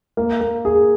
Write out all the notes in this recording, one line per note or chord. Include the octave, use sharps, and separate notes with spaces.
A#3
A#3
G#4